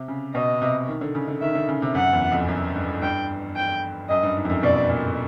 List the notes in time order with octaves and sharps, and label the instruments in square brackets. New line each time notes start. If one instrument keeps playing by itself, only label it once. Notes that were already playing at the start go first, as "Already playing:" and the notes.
Already playing: [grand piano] C3
C#3
[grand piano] B2 [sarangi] D#5
[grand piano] C3
D#3
D3
C#3
D3
[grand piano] D#3 [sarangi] E5
[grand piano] D3
C#3
C3
[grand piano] F#2 [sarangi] F#5
[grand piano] E2
F2
F#2
G2
[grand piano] G2 [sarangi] G5
[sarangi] G5
[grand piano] F#2 [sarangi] D#5
[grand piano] G2
G#2
F2
F#2
[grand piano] B2 [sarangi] D5
[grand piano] A#2